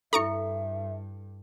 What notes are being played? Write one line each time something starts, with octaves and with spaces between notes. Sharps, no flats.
G2 E4 A4 E5 A#5 C#6 C#7